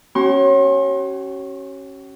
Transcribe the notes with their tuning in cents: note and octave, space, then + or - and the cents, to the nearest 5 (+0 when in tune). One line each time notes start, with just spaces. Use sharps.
C#4 -15 F#4 +45 C6 +40